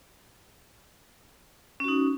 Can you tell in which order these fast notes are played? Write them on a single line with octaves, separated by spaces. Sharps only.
C#4 F#4 D#4